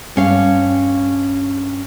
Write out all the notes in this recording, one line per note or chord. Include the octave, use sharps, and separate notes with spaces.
G2 C#4 F5